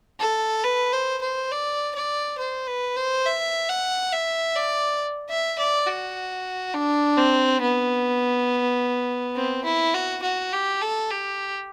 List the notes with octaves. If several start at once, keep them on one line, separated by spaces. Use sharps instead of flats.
A4
B4
C5
C5
D5
D5
C5
B4
C5
E5
F#5
E5
D5
E5
D5
F#4
D4
C4
B3
C4
E4
F#4
F#4
G4
A4
G4